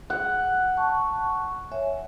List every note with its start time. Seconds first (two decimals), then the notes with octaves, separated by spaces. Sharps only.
0.10 F#5
0.77 A5 C#6
1.72 C#5 E5 G#5